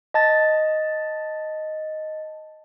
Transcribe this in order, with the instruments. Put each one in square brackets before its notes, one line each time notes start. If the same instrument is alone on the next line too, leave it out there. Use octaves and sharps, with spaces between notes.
[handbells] D#5 A5 A6